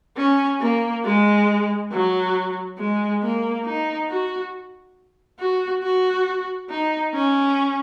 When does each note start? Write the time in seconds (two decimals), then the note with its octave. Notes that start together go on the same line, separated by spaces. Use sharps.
0.17 C#4
0.61 A#3
1.04 G#3
1.92 F#3
2.78 G#3
3.23 A#3
3.65 D#4
4.09 F#4
5.39 F#4
5.83 F#4
6.70 D#4
7.14 C#4